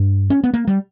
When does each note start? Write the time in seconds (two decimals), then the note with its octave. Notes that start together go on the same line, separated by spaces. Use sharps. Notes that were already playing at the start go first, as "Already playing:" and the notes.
Already playing: G2
0.30 C#4
0.44 B3
0.54 A#3
0.68 G3